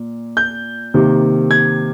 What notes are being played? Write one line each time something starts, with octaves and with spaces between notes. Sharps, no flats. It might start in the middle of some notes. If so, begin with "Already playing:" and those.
Already playing: A#2
G6
C3 D#3 A#3
G#6